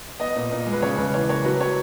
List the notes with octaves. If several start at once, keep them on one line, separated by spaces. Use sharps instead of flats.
B3 D#5
A#2
A#2
G#3
B4
C#3 C#5
C#3 B4
B4
E3 C#5
A#3 C#5
F#3 B4
F#3 C#5